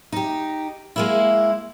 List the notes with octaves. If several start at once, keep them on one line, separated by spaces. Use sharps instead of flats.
D#4 G4
G#3 A#3 E4